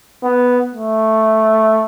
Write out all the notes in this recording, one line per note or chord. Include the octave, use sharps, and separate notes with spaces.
B3
A3